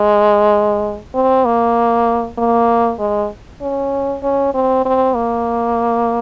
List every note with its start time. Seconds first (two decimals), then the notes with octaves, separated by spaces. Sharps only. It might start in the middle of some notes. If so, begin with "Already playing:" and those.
Already playing: G#3
1.15 C4
1.45 A#3
2.38 A#3
3.00 G#3
3.62 C#4
4.23 C#4
4.54 C4
4.85 C4
5.16 A#3